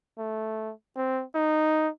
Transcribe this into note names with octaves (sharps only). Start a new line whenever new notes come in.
A3
C4
D#4